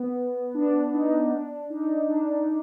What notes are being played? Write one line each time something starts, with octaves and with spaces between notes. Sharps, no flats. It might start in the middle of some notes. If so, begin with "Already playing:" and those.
Already playing: B3
D4
D#4
D4
D#4
D4